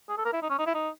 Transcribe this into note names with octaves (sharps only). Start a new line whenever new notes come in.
G#4
A4
A#4
E4
D#4
C#4
D#4
E4
D#4